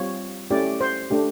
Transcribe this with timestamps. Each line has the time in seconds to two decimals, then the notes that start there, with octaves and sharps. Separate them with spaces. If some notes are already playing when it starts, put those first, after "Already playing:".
Already playing: G3 C4 F4 C#5
0.51 A3 C#4 E4 G4 D5
0.81 C5
1.11 A3 D4 G4